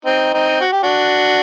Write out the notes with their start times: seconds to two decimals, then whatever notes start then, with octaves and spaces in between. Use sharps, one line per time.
0.05 C4 D#4
0.34 C4 D#4
0.61 F#4
0.72 G4
0.83 D4 F#4